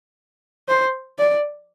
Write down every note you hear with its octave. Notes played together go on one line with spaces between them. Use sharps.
C5
D5